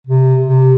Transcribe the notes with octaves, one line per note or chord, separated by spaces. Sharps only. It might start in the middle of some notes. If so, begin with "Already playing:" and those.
C3
C3